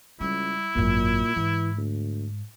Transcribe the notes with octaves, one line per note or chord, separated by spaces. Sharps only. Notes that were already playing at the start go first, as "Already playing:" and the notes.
C#2 G3 E4
G#1 F#2 A#2
G#2 E3
D2